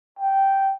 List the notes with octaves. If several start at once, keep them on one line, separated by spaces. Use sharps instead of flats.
G5